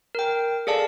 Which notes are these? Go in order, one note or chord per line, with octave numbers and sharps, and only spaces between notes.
A#4 G5
G#4 A4 D5 F5 A5